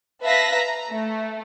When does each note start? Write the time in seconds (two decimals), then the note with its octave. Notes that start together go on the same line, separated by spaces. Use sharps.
0.24 B4 E5 F5 A5 A#6 B6
0.55 A#5
0.91 A3